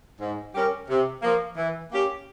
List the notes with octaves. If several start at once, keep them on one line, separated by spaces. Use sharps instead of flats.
G#2
G3 C#4 G4 A#4
C3
F3 A#3
E3
A#3 C#4 G4